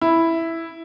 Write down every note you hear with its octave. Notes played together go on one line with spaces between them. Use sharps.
E4